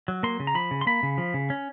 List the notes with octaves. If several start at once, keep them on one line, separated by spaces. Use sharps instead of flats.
F#3
A#3 C6
C#3
A#5
F3 B5
C#3
C6
A#3 B5
C#3
F3
C#3
C#4